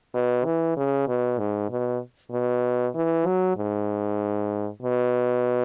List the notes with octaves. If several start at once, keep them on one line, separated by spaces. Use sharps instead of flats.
B2
E3
C#3
B2
G#2
B2
B2
E3
F#3
G#2
B2